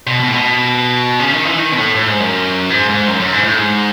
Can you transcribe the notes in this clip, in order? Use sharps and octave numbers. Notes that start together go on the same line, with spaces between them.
B2
B2
A2
B2
C#3
D#3
E3
D#3
B2
A2
A2
G#2
F#2
G#2
G#2
F#2
F#2
G#2
A2
G#2